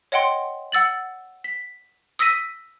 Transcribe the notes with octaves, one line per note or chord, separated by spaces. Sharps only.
C#5 D#5 F#5 G5 C6
F#5 E6 A6 F#7
B6
D#6 E6 A#6 B6 D#7